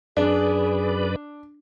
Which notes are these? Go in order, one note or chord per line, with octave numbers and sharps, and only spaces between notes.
F#2 D4 G#4 B4 D5